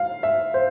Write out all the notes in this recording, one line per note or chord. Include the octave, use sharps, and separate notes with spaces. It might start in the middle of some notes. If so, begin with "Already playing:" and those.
Already playing: F5
E5
C5